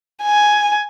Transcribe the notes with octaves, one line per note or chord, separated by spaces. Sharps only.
G#5